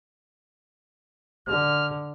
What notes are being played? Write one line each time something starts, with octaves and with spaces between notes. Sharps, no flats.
D3 F6